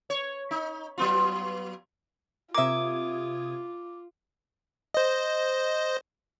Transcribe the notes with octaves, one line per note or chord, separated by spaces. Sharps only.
C#5
D#4
F#3 B3 F4
C3 A#3 F4 E5 D6 D#6 G#6
C5 D#5